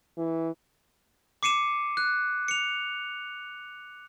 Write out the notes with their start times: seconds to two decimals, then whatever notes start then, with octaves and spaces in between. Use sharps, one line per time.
0.18 E3
1.43 D6 C7 C#7 D#7 E7
1.97 F#6
2.48 C#7 F7